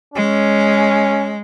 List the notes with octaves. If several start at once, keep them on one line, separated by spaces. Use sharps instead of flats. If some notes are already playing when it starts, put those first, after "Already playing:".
G#3 C#4